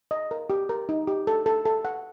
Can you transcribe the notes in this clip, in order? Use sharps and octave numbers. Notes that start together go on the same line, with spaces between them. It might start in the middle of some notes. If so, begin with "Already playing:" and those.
D#5
A#4
G4
A#4
D#4
G4
A4
A4
A4
F#5